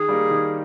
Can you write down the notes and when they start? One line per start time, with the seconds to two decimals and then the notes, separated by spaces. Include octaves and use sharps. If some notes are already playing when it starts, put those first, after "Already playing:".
Already playing: D#3 G#4
0.08 G3 A#3 D#4
0.31 D#3